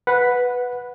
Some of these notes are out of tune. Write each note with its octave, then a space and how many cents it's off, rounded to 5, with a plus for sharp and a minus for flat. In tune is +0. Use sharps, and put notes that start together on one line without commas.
B4 +0 F#5 -15